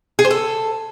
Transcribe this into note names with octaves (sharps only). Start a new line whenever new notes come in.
G#4
C5
A4